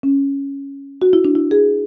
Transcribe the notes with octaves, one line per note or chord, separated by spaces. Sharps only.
C#4
F#4
E4
D4
E4
G#4